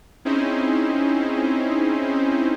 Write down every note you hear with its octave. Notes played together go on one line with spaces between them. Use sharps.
C4 C#4 D#4 E4 G#4 C5